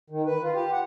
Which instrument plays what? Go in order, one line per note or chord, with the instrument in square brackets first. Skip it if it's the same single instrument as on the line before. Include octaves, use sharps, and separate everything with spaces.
[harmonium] D#3
B4
F4
G4
F#5